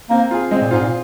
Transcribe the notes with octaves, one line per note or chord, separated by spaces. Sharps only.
A#3 C4
F4 G#4
G#3 C4
A#2
G#2 F4 G#4
A#2